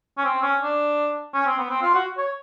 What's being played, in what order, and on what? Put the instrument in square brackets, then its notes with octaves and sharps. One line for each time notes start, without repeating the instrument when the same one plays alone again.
[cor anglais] C#4
C4
C#4
D4
C#4
C4
B3
C4
F4
F#4
C#5